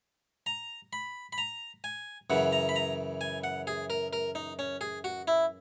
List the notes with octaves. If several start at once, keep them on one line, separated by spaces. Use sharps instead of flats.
A#5
B5
B5
A#5
G#5
F#2 C#3 E3 F#5
A#5
B5
A#5
G#5
F#5
G#4
A#4
A#4
D#4
C#4
G#4
F#4
E4